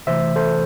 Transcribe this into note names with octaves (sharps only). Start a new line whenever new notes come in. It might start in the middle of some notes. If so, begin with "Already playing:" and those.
C3 E3 A3 C5 E5
A4 C5